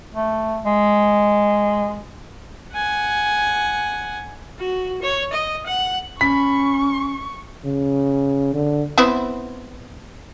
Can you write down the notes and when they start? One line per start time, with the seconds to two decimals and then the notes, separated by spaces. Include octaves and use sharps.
0.14 A3
0.65 G#3
2.73 F#5 G#5
4.59 F#4
5.02 C#5
5.33 D#5
5.66 F#5
6.21 C#4 B5 C#6 B6
7.65 C#3
8.54 D3
8.98 B3 C4 E4